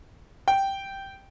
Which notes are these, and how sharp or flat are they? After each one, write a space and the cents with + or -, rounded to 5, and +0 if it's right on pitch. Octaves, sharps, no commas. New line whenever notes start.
G5 -5